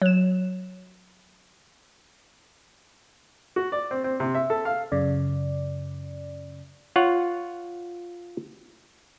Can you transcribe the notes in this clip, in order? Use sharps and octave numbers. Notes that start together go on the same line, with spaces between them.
F#3 E7
F#4
D5
C4
C4
C3
E5
A4
F5
F#2 C#3 D5
F4 C#5 F#5